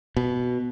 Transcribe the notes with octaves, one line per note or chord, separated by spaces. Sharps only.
B2